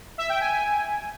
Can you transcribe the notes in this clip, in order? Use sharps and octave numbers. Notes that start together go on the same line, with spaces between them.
E5
G5
G#5